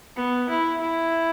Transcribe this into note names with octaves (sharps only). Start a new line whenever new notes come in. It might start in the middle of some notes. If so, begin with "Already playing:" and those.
B3
E4
E4